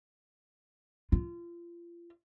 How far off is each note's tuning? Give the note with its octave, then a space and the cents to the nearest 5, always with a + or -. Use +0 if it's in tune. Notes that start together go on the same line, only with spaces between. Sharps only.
F4 -30